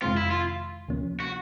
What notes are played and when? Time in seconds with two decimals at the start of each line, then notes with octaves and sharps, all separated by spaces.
0.02 F2 C3 D#3 G#3 C4 F4
0.17 E4
0.31 F4
0.88 D2 C3 F3 A#3 C#4
1.20 F#4